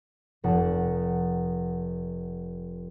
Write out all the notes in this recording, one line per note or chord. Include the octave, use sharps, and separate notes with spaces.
F1 F#5 A5